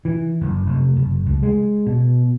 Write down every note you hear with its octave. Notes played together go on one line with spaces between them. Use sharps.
E3
F#1
F1
F#1
C#2
G#3
B2